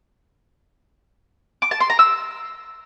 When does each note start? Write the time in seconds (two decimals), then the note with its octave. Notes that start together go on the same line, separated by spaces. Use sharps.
1.62 D6
1.71 A5
1.80 C6
1.90 A#5
1.99 E6